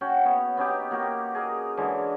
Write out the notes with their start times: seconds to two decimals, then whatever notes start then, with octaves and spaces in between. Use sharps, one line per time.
0.01 C#4 F#4 F#5 G5
0.25 B3 C#5
0.57 B3 C#4 D#4 G4
0.91 A#3 F#4 G4
1.35 G#4 A#4 D#5
1.77 D3 E3 G#3 C#4